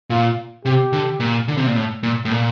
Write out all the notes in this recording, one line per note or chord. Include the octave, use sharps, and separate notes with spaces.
A#2 F4
C3 G4
D3
A#2
D3
C3
A#2
A2
A#2
A2
A#2